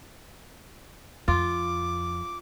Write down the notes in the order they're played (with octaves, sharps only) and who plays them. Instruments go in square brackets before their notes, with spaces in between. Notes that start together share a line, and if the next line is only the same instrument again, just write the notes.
[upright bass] F2 [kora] F4 [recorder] D6